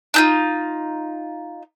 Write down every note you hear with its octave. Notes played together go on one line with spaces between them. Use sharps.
D4 D#4 F4